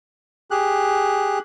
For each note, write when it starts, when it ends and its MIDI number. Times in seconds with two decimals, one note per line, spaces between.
0.51 1.39 67
0.51 1.39 68
0.51 1.39 90